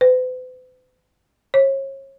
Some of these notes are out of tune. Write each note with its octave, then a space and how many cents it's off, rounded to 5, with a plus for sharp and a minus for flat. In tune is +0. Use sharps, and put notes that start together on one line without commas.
B4 +45
C#5 -35